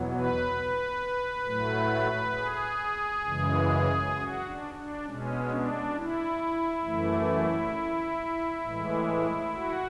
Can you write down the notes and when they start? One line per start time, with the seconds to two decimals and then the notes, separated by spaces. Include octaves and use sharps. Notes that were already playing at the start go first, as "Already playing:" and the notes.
Already playing: E2 B2 F#3
0.11 B4
1.46 A2 F#3 A3
2.35 G#4
3.25 F#2 C#3 E3 G#3
4.15 F#4
4.45 D4
4.74 D4
5.04 B2 G#3 C#4
5.50 D4
5.95 E4
6.84 F#2 E3 A3
8.63 A2 E3 G#3
9.53 F#4